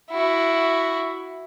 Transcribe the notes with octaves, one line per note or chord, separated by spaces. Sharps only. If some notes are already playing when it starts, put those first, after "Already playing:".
E4 F#4